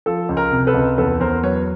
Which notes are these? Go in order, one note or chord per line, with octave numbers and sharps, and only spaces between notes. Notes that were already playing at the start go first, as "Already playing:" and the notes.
F3 A4
C#2
A#4
C3
A4 B4
C#2
E2 A4 B4
E2 A#4 C5
F#3 B4 C#5